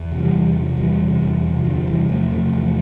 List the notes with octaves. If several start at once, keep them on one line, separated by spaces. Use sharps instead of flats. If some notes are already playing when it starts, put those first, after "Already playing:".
Already playing: E2
C3
E3 G3
E2
C3
E2 E3 G3
C3
E2
C3
E3
E2 D3 F3
C3 E3 G3
E2 F3 A3
C3 F3 A3
E2